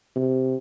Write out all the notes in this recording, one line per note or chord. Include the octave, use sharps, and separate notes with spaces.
C3